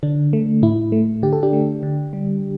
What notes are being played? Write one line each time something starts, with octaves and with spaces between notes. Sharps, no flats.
D3 D4
A3
A2 E4
A3
D3 G4
A4
D4 G4
A3
D3
G3